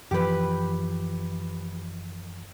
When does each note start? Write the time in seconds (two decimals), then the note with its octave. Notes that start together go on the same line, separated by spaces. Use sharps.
0.11 F#2 E3 F3 G4 B4